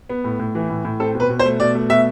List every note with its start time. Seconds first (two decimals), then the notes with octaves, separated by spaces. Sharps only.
0.10 B3
0.24 A2
0.39 A2
0.55 E3
0.70 A2
0.85 A2
1.00 C4 A4
1.14 B2
1.20 B4
1.29 B2
1.39 C5
1.45 A3
1.60 B2 D5
1.75 A3
1.89 B2 E5